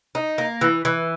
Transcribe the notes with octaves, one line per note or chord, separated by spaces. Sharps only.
D#4
A#3
E3
E3